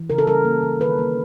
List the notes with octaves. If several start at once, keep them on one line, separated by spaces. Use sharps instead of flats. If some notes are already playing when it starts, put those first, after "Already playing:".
Already playing: E3
C#3 A#4
A4
G3 A#4
A#3
E3
D#3 B4
A#3